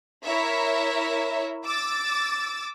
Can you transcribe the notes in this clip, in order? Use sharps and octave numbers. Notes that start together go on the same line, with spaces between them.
E4 A#4 C#5 E5
D6 E6 A6